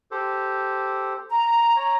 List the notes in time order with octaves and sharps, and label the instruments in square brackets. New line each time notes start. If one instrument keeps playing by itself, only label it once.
[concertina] G4 A4 C5
[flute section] A#5
[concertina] C#5